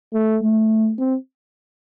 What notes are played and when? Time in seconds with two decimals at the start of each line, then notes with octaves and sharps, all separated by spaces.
0.13 A3
0.41 A3
0.99 C4